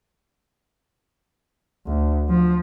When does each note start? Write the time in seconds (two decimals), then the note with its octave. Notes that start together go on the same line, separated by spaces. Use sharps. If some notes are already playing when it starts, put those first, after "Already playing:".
1.87 D2
2.29 F3